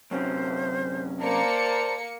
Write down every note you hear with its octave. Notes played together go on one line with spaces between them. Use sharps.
F#2 C3 C#4 C5
A#3 C5 D5 A5 A#5 C#7